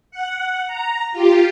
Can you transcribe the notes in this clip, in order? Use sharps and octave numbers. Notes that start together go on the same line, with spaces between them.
F#5
A#5
F4 G4